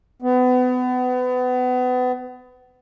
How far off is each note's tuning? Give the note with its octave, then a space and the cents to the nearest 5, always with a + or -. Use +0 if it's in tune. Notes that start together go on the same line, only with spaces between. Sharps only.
B3 +30